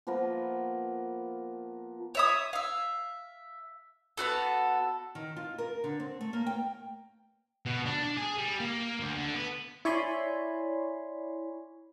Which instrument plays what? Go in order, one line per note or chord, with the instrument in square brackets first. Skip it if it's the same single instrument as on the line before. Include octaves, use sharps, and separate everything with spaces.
[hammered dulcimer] F3 A#3 B3 A#4
[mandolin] C#5 E5 D#6
E5 F5
B3 D4 F#4 A4
[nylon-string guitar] D#3
F4
A#4
D3
C4
A3
A#3
G5
[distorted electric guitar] B2
D4
D4
G#4
G3
A#3
D2
D3
B3
[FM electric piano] E4 C#5 D5 G#5 B5 C6